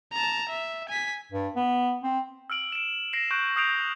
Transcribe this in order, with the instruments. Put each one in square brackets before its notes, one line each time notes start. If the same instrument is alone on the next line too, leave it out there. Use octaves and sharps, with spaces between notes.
[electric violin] A5 A#5
E5
G#5 B6
[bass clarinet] G2
B3
C4
[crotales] E6 F6 D7 F#7
D7 E7
A#6 C7 D7 E7
C#6 F#6 G6 D7
D#6 F6 G6 C7 D7 F7